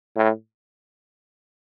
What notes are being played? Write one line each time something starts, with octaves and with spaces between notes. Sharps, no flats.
A2